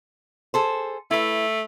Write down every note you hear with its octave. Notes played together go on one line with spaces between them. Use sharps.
G#4 A4 C5
A3 E4 B4